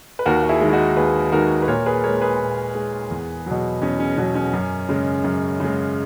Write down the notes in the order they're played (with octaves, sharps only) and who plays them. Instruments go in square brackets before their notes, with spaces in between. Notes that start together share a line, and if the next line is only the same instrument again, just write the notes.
[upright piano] B4
D#2 F#4 A#4
F#4
E4 G#4
D#3 G#3
E4
D#4 F#4
D#2 G#4 B4
D#3 G#3 F#4 A#4
B4
A#2 A#4 C#5
G#4 B4
G#3 A#4 C#5
G#4 B4
A#2
G#3
E2
B2 F#3
E2 C#4
C#4
B2 F#3 C#4
C#4
F#2
C#3 G#3
F#2
C#3 G#3